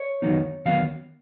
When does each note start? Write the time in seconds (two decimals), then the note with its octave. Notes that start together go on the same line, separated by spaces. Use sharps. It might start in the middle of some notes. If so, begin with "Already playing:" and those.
Already playing: C#5
0.22 D#3 F#3 B3 D#4
0.65 D#3 F#3 B3 F5